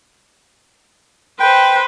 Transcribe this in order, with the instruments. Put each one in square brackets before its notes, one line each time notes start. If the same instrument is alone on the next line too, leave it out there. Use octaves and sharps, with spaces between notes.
[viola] B4 C5 [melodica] G5